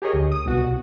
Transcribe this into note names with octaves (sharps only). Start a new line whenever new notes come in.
G4 G#4 A#4 C#5 D#5
D2
D#6
C2 B2 F#4